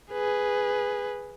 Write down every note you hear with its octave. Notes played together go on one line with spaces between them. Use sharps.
G#4 B4